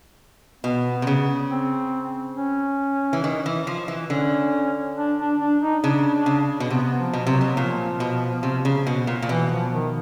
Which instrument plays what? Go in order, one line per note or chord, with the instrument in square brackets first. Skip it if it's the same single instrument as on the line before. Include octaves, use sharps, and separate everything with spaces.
[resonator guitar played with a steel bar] B2 [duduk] B3
[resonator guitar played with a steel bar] C3
C#3
[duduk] C4
C#4
[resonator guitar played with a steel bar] E3
D#3
E3
F3
E3
[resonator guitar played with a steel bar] D3 [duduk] C#4
[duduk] D4
D4
D4
D#4
[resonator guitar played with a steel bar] C#3 [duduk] D4
[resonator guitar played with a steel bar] C#3
B2
[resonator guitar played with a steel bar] C3 [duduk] B3
[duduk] F3
[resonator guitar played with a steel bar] B2
[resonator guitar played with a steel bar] C3 [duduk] F#3
[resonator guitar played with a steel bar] B2
[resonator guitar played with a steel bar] A#2 [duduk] F3
[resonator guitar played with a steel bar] B2
C3
C#3
B2
A#2
A#2
[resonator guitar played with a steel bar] B2 [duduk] E3
[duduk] F3
D#3